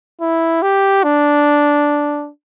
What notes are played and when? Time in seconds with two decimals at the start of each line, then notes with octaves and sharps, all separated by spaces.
0.21 E4
0.63 G4
1.04 D4